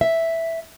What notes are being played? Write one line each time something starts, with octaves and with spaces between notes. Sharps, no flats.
E5